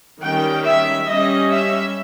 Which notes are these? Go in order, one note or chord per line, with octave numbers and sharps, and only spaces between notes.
D#3 G3 C#4 G5
E5
G3 C#4 D#5
E5